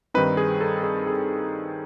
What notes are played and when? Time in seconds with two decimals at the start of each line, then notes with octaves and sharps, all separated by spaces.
0.14 G2 D#3 G3 C4 D#4 B4
0.37 G#4
0.61 A4
0.83 G#4
1.07 G#4